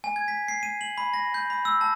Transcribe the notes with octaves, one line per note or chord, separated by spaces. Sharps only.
G#5
G#6
B6
C7
D#7
F#7
B5
A#6
G6
B5
E6
A5